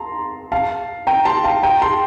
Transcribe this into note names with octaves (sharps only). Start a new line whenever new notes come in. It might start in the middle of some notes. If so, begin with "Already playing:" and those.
Already playing: A5 A#5 C6
F5 A5
G5 A#5
A5 C6
F5 A5
G5 A#5
A5 C6